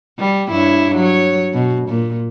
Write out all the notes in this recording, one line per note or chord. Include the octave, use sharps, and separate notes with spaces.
G3
G2 E4 C#5
F#3 C#5
B2
A#2